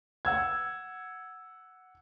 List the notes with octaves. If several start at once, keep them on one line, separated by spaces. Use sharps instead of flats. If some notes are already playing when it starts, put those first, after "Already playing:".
F#5 E6 G#6